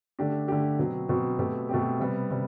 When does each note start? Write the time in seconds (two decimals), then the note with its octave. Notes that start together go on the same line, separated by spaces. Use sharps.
0.19 D3 A3 D4 G4
0.48 D3 A3 D4 G4
0.79 B2 F#3 C4
1.09 B2 F#3 C4
1.39 B2 A3 C4 G4
1.69 B2 A3 C4 G4
2.00 C3 G3 B3
2.30 C3 G3